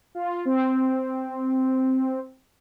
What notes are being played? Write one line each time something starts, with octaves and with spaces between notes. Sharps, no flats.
F4
C4